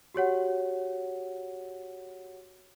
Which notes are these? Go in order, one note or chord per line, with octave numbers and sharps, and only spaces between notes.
F#4 G4 C#5 F#5